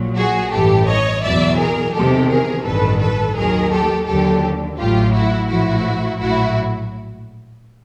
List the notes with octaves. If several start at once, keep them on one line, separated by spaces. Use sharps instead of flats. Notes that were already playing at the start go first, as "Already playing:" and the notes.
Already playing: A#1 A#2 F#3
F#4 G#4
A1 G2 E3 G4 A4
C#5 D#5
E2 B2 F#3 D5 E5
G#4 A#4
E2 C3 D#3 G4 A4
G#4 A#4
A1 G2 D#3 A4 B4
A4 B4
D#2 D#3 F#3 G#4 A#4
G4 A4
D#2 D3 F#3 G4 A4
A1 A2 F#3 F4 G4
E4 F#4
A#1 A2 F3 E4 F#4
A#1 A2 F#3 E4 F#4